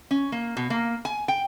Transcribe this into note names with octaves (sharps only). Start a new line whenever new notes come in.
C#4
A#3
B2
A#3
G#5
G5